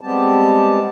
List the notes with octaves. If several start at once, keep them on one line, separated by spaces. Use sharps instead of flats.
G3 G#3 B3 C4 G4 A5